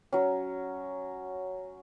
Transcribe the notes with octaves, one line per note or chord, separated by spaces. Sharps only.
F#3 C#4